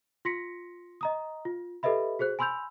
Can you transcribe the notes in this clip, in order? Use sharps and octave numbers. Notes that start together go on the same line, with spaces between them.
F4 C6 A#6 B6 C#7
D#5 A#5 D#6
F4
G4 A4 B4 D#5 E5 B5
F#4 G#4 C5 F#6
G#5 B5 C6 E6 G6 F7